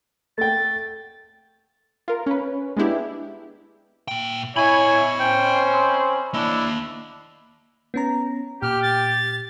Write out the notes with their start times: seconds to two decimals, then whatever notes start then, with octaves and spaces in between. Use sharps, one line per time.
0.38 A3 G5 A6
2.08 F4 A#4
2.26 C#4 B4
2.77 G#3 B3 D4 E4 G4
4.08 A#2 G5
4.57 E4 C#5 D#5 G#5 B5
5.20 C#4 C5 G5
5.73 C4
6.34 A#3 D4 E4 D#5
7.94 B3 C#4 A#5
8.62 A#2 G4 F6
8.83 A6